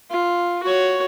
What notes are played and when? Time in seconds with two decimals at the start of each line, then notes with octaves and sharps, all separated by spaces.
0.10 F4
0.63 F#4 C#5